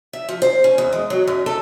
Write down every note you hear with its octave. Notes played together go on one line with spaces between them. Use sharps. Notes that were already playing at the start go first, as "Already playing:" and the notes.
E5
F3
C5
C#4
E2
G#3
F#3
F#2
A4